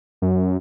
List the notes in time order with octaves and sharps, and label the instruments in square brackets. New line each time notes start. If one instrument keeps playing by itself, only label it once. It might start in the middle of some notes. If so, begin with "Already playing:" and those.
[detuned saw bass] F#2